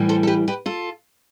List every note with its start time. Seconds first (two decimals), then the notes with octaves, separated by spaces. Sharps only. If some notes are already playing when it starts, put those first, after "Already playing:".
Already playing: A2 E3 G3
0.09 A4 C5
0.23 A4
0.27 G4 B4
0.48 G4 B4
0.66 F4 A4